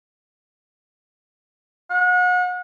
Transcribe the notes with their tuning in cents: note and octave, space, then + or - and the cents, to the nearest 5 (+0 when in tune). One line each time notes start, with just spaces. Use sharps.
F#5 -35